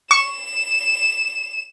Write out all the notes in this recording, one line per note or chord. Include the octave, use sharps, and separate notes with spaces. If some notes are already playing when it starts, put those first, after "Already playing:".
C#6 E7